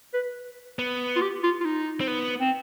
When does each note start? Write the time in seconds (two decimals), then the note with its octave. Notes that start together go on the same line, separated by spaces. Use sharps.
0.14 B4
0.79 B3
1.16 F4
1.22 G4
1.43 F4
1.61 F4
1.65 D#4
2.00 C4
2.07 B3
2.40 C4